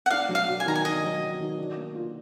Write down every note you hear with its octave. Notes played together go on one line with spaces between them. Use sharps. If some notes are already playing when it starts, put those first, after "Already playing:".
F#5
D4 F5
F#3
F5
F#4
G#5
D#3 A#5
G#5
D4 D#5
F#3
F#4
D#3
D4
A#3
F4